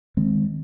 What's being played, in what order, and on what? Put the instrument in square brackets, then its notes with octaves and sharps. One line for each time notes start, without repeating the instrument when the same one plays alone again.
[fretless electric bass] D#3 G#3 C4